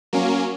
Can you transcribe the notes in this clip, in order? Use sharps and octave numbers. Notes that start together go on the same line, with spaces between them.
F#3 A#3 C#4